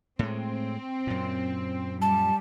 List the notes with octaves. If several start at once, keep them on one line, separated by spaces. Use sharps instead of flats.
A2 G#3 C4
F#2 A#2
G3 A5